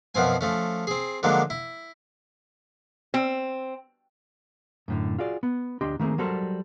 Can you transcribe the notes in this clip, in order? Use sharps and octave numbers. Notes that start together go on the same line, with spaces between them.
F#2 B2 F3 C4 G#5
F3 A3 C#4
C4 G#4
D3 F3 F#3 G#3 A#3
E4
C4
F#2 A2 D3
F4 F#4 G#4 D5
B3
D2 D4 G4 D#5 C6
D#3 A3 A#3 C4 G#4
F#3 G3 F#4 A4 A#4 C5